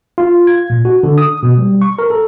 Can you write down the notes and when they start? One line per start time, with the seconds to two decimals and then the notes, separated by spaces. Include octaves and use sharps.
0.18 F4
0.47 G#6
0.70 A#2
0.85 F#4
1.03 D3
1.18 D#6
1.43 B2
1.58 G3
1.82 C#6
1.99 A#4
2.10 A4